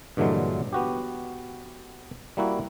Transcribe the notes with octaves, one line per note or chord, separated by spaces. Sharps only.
G2 A#2 D3 E3 F#3 G#3
B3 F#4 G4
G3 A#3 E4 F#4